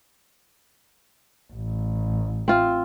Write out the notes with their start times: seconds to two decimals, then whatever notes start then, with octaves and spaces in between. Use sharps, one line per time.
1.53 A1
2.48 C4 F4